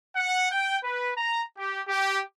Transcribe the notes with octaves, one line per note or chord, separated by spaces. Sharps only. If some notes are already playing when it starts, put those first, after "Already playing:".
F#5
G5
B4
A#5
G4
G4